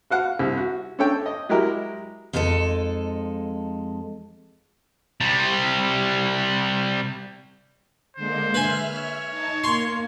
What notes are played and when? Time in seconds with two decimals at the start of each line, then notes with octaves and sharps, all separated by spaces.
0.10 F#4 F5 F#5
0.39 C2
0.57 F#4
0.99 C#4 D4 A4 C#5 G5
1.26 D#5
1.49 F#3 G#3 E4 G4 A#4
2.33 F2 G#3 D#4 F#4 A4
5.21 C3 G3
8.16 D3 G#3 A#3 C5
8.54 B4 E5 G#5 F6
8.95 C#5
9.30 D#4 A5
9.64 A#3 C6 C#6